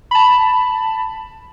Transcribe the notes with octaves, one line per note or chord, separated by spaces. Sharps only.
A5 B5